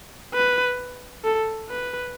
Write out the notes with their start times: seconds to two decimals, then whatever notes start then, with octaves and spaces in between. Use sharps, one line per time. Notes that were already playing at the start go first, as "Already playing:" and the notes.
0.34 B4
1.24 A4
1.70 B4